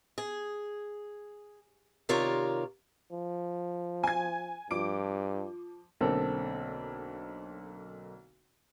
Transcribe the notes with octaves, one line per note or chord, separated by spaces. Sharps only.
G#4
C3 D#3 F4 A#4 C#5 D5
F3
G#5 G#6
G2 F3 D6 D7
B1 D3 A#3 C4 A4